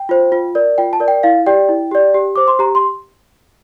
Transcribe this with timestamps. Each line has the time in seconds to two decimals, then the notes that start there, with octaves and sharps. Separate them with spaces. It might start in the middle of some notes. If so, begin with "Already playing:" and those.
Already playing: G5
0.09 F4 C5
0.32 F4
0.55 A#4 D5
0.78 F4 G5
0.93 A5
1.00 A#4 D5
1.08 G5
1.23 E4 F5
1.46 G4 D5 G5
1.69 E4
1.91 G4 D5
2.14 G4
2.36 C5 D6
2.48 C6
2.59 G4 A#5
2.75 C6